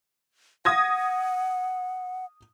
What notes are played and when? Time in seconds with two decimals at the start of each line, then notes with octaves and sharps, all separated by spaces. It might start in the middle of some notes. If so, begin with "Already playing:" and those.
0.65 F#5 D#6 G#6 A#6